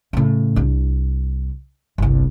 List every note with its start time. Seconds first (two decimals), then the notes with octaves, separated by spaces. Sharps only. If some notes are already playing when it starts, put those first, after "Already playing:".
0.13 A2 C#3
0.56 C2 D4
1.98 G1 C2